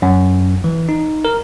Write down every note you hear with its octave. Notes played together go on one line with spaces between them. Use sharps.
F#2
E3
D#4
A#4